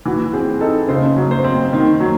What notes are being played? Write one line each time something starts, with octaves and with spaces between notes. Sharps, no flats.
E3 F#4
C4 G#4
D#4 A4
C#3 C5
F#3
C5
C4
D#3
F#3